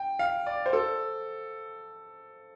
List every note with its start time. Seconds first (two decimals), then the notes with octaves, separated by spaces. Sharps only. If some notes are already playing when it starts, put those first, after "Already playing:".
Already playing: G5
0.19 F5
0.47 D5
0.66 C5
0.73 A4